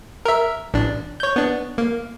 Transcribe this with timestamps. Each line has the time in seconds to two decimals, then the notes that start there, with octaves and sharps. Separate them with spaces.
0.25 A#4 E5
0.74 A1 D4
1.20 C#5 G6
1.36 B3 D4
1.78 A#3